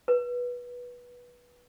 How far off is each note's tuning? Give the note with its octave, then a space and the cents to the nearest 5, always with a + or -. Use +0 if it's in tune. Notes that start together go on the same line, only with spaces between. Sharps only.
B4 -15